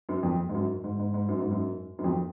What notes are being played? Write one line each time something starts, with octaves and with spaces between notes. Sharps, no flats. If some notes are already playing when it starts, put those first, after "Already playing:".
F#2
F2
G#2
F#2
G#2
G#2
G#2
F#2
G#2
F#2
F#2
F2